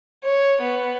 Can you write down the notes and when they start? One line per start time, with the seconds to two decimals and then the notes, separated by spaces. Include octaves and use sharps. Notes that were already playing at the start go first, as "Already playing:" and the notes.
0.24 C#5
0.61 B3